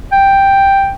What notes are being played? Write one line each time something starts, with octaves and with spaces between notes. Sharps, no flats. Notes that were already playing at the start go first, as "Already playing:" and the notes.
G5